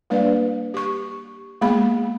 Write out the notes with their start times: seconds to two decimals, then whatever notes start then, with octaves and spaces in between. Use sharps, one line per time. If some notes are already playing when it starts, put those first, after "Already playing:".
0.10 G3 A#3 D4 B4 D5 F5
0.74 G4 C#6
1.61 G#3 A#3 B3 G#4 B5